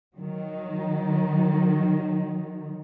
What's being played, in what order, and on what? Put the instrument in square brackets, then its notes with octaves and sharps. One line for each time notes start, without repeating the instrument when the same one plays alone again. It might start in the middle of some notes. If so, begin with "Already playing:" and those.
[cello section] D#3 F#3